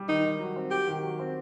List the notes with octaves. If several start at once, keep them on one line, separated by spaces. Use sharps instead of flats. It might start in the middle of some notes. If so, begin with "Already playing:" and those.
Already playing: G3
D#3 D#4
D#3
F#3
C4
F#4 G4
D#3
F#3
C4